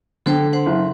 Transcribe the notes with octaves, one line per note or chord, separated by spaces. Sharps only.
D3 A4 C5 G5
C5 F#5 C6
F#1